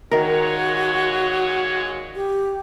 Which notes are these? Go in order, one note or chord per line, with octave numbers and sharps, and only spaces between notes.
A#2 D#3 G#3 F#4 A#4 C#5
G4